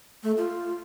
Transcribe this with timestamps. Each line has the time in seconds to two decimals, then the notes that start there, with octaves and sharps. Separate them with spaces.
0.23 A3
0.37 F4